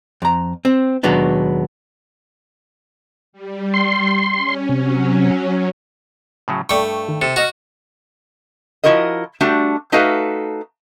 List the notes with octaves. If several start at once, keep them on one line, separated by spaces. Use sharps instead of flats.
F2 A#5
C4
D#2 B2 F#3 G#3 B3 D4
G3
C6
C#4
C3 F#3 C#4
A2 C#3 F#3
G2 A3 D5 G5 C#6
D#3
C3 A4
F#4 D#5 F6 A#6
F3 A#3 E4 F#4 A#4 D#5
G3 A3 D4 F#4
A3 D#4 F#4 A4 B4 F5